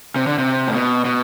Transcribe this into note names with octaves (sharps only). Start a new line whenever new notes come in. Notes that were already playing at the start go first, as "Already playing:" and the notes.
C3
D3
C3
A2
B2
B2